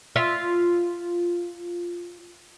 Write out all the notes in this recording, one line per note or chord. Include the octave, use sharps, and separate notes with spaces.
F4 E5